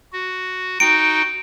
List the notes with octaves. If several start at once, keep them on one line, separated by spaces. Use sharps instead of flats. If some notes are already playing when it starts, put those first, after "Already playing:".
F#4
D#4 F#4 G5 D7